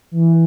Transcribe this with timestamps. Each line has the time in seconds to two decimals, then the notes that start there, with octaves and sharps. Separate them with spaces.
0.11 E3